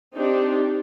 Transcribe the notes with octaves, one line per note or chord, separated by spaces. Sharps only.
C4 D4 D#4 G4